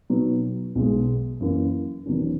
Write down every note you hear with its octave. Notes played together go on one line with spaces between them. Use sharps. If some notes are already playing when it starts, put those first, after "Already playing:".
B2 F#3 B3 D#4
B1 B2 G#3
F#2 E3 A#3 C#4 E4
E1 E2 D#3 F#3 C#4